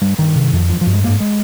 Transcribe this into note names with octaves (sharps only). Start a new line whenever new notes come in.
G2 G3
G2 D#3
C3
F2
G2 F3
F3
G2
G#3
G#2 A#3
G#3